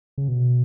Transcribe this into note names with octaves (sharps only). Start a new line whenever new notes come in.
C#3
B2